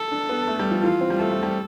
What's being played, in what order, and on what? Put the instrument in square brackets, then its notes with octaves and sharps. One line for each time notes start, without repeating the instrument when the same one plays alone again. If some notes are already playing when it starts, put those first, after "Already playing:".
Already playing: [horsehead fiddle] A4
[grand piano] D4
B3
A3
G3
F3
[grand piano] E3 [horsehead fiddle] F4
[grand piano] C4
G3
[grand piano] A3 [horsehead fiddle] A4
[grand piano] A3
G3